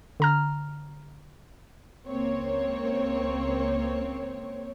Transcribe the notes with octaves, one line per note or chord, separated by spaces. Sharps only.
D3 A#5 F6
C#2 A#3 C4 C#5